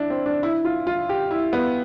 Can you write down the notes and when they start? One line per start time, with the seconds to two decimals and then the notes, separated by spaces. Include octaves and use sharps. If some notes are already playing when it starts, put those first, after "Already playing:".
Already playing: D4 E4
0.10 C4
0.26 D4
0.43 E4
0.65 F4
0.87 F4
1.09 G4
1.31 E4
1.53 B3